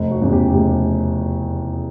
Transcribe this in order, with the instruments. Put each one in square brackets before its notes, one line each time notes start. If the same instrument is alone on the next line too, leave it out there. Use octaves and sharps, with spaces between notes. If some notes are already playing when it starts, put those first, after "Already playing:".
Already playing: [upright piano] F1
F#4
E2 C#3
G4
F1 G4